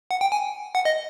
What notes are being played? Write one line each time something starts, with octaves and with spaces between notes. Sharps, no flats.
F#5
G5
G#5
F#5
D#5